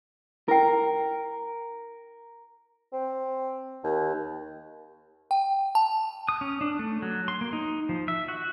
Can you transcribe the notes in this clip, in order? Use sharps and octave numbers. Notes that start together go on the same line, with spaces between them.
E4 A#4 G5
C4
D#2
G5
A5
D#6
C#4
D4
A3
F#3
C6
A#3
D#4
F3
E5
F#4